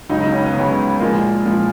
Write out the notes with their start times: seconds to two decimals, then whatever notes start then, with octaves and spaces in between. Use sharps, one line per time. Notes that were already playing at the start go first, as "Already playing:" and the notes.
0.09 C#2 C#3 F#3 D#4
0.21 D#4
0.32 C#4
0.43 B3
0.55 C#2 C#3 F#3
0.99 A#2 F3 G#3 A#3
1.45 A#2 F3 G#3